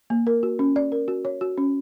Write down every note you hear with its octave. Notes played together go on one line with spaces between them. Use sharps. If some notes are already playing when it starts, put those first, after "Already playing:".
A#3
A#4
F#4
C#4
D5
A#4
F#4
C#5
F#4
C#4